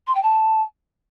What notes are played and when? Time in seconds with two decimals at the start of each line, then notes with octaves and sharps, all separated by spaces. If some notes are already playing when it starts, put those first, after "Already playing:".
0.07 C6
0.15 G5
0.23 A5